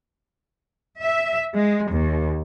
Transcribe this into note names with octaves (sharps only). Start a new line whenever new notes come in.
E5
G#3
D#2